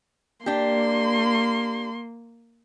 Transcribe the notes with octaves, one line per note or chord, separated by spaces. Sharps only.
A#3 D4 G4 C6